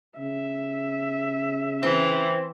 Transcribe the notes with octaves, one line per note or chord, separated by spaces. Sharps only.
C#3 E5
E3 C4